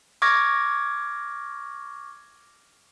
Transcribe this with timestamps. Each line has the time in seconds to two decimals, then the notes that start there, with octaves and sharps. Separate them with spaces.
0.22 C#6 D6 F6 G#6 A#6